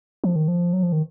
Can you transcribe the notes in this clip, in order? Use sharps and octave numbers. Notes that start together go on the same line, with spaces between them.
F3
D#3
F3
F#3
F3
D#3